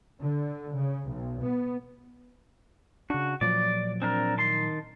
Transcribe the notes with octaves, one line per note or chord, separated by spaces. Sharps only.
D3
C#3
B1
B3
C#3 D4 F#4
A#2 F3 F#3 D5
C4 D4 A#4
D#3 A5 C6